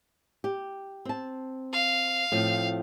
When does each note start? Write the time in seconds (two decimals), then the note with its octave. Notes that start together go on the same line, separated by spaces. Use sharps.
0.44 G4
1.05 C4 A5
1.73 F5
2.32 A2 F3 C4